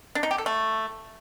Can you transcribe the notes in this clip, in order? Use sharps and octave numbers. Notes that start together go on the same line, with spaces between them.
D4
D#4
G4
A4
A3